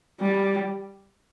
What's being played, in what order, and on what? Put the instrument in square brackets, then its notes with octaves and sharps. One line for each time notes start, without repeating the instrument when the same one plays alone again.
[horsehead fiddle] G3